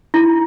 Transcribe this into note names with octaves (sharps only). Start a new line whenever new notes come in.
E4